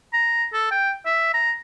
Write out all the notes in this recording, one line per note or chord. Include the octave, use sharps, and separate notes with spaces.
A#5
A4
G5
E5
A#5